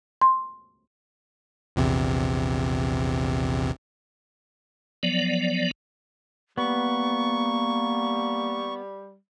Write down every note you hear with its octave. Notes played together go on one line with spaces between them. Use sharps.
C6
A#1 E2 C3
F3 F#3 B3 D5
G3 A#3 B3 C#6